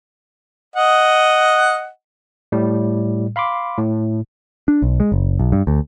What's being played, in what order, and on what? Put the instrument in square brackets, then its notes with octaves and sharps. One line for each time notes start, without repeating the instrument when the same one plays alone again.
[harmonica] D#5 F#5
[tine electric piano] A2 G3
F5 B5 C6 D6
A2
[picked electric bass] D4
B1
G#3
F#1
B1
G2
D2